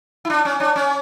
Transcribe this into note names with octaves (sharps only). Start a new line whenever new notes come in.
E4
D4
C#4
D4
C#4